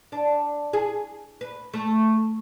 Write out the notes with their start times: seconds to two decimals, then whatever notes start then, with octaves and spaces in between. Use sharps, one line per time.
0.12 D4
0.73 G#4
1.41 B4
1.74 A3